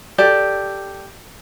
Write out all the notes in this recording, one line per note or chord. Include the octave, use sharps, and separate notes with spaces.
G4 A4 D5